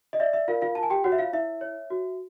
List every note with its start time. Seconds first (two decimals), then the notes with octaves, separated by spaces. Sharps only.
0.13 D#5
0.19 D5 E5
0.33 E5
0.48 F4 A#4 F5
0.62 F4 F5
0.75 F4 A5
0.83 G#5
0.90 G4 G5
1.04 F#4 C#5 F#5
1.12 E5
1.18 F4 F5
1.33 E4 E5
1.61 C#5
1.90 F#4